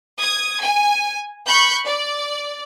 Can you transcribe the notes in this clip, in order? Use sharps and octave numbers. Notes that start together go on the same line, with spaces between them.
D#6 G#6
G#5
B5 C#6 F#6 G6
D5